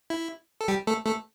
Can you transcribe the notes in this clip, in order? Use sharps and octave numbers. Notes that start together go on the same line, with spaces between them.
E4
A4
G3 G4
A3 A4
A3 A4